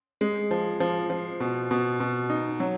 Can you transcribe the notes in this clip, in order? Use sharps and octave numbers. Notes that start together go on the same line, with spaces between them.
G#3
F3
F3
F3
B2
B2
B2
D#4
F#3